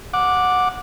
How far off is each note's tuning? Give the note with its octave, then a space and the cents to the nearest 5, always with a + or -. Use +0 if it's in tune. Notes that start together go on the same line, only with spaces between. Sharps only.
F#5 -15 D6 +0